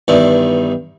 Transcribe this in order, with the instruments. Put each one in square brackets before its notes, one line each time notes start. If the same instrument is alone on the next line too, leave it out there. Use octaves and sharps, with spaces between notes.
[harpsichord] E2 G2 D#3 E4 D5